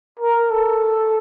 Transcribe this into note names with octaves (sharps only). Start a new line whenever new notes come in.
A#4
A4